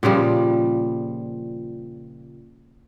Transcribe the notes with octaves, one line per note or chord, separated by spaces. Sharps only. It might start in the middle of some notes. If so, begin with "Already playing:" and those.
A#2 C#3 F3 G3